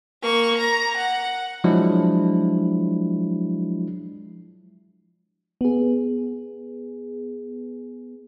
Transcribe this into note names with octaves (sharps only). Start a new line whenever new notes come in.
A#3 C#6
A#5
F#5
F3 F#3 G#3 D4 E4
B3 G#4